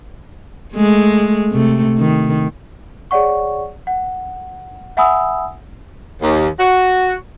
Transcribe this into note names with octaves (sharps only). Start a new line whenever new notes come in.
G#3 A3
C3 A3
D#3
G#4 C#5 D5 F#5 C#6
F#5
E5 F#5 G#5 B5 D#6 E6
D#2
F#4